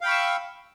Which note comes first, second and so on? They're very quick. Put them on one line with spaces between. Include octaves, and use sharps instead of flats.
F5 G5 B5 C#6 E6